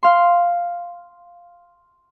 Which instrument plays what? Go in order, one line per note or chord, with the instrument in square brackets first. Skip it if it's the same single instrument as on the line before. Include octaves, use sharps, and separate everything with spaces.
[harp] F5 C6